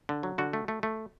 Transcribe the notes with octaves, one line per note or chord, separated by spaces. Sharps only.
D3
F#3
D3 F#4
A3
A3
A3